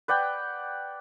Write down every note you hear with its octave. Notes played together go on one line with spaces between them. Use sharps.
B4 D5 F#5 G5